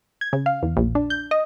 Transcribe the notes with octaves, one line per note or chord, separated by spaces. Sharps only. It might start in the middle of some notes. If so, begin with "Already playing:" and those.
G#6
C#3
F5
E2
A#1
D4
G6
D#5